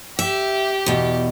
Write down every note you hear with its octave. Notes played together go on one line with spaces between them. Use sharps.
G4 E5
E2 B2